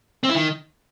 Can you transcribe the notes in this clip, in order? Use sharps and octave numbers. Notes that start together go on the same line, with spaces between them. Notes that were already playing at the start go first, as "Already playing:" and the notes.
C4
E4
D#3